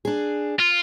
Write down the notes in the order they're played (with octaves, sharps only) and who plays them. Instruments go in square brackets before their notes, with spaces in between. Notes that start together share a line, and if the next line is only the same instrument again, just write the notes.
[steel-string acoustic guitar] D4 G#4
[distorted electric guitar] F4